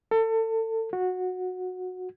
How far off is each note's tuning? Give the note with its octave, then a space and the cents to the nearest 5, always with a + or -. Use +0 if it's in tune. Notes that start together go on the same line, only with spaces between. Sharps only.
A4 +30
F#4 -15